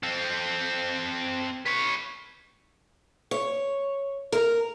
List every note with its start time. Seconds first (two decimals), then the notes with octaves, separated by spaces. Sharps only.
0.03 C4 A4
1.66 B4 C#5
3.31 C#5
4.32 A#4